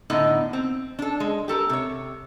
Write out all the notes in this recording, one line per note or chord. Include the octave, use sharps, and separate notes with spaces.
A2 D3 B3 D#4 D#5
C4
D4 A4
G#3
G4 A4 A#4
C3 C#5